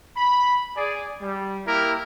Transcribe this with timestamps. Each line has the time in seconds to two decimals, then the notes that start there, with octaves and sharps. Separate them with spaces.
0.17 B5
0.76 G#4 D5
1.21 G3
1.67 A#3 E4 G4 A#4